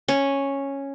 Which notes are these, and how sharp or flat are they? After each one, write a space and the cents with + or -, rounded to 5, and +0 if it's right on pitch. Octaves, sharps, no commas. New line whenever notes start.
C#4 -5